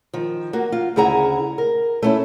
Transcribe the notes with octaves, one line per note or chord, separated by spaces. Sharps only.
D#3 F3
A#3 F#4
F4
D2 C#3 E4 G#4 F#5 A#5
A#4
A3 C#4 E4